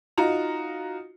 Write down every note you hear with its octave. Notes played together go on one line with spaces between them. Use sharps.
D#4 F4 F#4 A#5